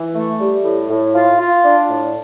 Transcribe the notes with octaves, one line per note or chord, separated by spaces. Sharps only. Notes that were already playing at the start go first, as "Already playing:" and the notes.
Already playing: E3
A3
G3
A2
A2
F4
F4
D4
A2